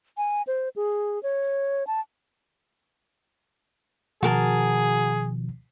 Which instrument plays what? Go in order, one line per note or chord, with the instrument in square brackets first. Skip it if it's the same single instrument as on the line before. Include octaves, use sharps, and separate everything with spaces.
[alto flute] G#5
C5
G#4
C#5
A5
[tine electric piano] B2 D#3 F3 [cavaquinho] F#4 A#4 A5 [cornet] G#4